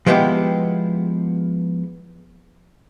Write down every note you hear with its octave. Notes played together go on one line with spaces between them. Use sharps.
F3 G#3 B3 E4 G4